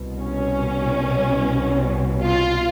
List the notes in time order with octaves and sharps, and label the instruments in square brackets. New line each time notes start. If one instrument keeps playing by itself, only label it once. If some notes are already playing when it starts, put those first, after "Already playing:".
Already playing: [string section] C2 B2
C#4
F4